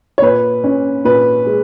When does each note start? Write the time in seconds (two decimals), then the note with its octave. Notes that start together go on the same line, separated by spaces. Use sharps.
0.18 C#5
0.22 A#2 B4
0.64 C#4
1.05 A#2 B4
1.46 G#3